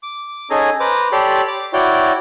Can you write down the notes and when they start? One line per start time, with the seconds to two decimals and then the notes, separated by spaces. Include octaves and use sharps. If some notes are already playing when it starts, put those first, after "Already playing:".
0.03 D6
0.50 C#4 D#4 G#4 A4 G#5 A#5
0.80 B4 C5 A#5 D6
1.12 G4 A4 C#5 D5 B5 C6
1.48 D6
1.73 E4 F#4 C#5 D5 G5